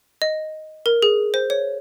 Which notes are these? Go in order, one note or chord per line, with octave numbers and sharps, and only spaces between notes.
D#5
A#4
G#4
C5
C#5